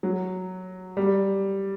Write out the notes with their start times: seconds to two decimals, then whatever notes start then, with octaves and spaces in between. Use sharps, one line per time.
0.03 F#3
0.97 G3